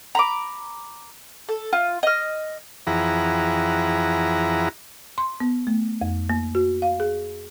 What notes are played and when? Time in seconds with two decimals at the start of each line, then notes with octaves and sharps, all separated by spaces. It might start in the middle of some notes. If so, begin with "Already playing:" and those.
0.15 A#5 B5 D6
1.49 A4
1.73 F4
2.03 D#5 F6
2.87 F2 E3 E4 G#4 F#5 A#5
5.18 C6
5.40 B3
5.67 A3
6.01 F2
6.30 A#3
6.55 F#4
6.82 F5
7.00 G#4